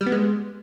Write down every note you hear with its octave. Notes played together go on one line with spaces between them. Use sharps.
G3
B3
G#3